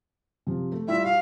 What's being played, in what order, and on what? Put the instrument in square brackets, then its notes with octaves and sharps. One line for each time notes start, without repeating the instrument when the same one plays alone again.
[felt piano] C3 F3
A3
[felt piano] G3 E4 F4 [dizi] E5
[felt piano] F#4 [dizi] F5